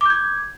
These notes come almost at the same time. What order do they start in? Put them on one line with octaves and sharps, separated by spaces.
D6 G6 G#6